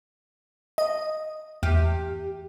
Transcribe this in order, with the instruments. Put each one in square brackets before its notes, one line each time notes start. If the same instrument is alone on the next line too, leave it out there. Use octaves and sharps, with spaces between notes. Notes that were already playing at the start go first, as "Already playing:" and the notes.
[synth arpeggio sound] D#5
[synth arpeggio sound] E2 [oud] G4